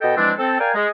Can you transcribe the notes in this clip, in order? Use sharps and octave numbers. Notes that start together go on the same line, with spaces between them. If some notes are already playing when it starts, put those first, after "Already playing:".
B2 A4 D#5 G5
E3 F3 G#3 C4 D4
C4 A4
A#4 D5 F5 G5 G#5
G#3